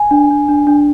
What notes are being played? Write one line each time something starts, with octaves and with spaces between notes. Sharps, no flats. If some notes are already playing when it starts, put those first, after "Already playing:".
Already playing: G#5
D4
D4
D4
D4